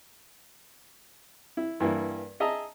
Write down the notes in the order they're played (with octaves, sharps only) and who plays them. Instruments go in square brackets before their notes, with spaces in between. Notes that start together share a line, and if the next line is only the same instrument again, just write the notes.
[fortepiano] E4
G2 E3 A#3 E4
G#4 D#5 E5 A5 A#5